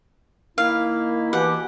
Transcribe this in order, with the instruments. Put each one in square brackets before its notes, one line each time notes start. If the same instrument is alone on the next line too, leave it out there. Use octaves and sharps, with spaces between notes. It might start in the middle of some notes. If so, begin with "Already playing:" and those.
[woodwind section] D#3 A#3 E4 [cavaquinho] F5
[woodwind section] B2 E3 G4 [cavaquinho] F#5